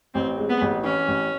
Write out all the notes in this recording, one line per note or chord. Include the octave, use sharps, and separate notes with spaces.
A1 C4
G#3
B3
A1
E3 C#4
A1